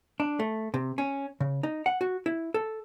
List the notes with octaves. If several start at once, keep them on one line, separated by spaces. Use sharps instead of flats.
D4
A3
C3
C#4
C#3
D#4
F#5
F#4
E4
A4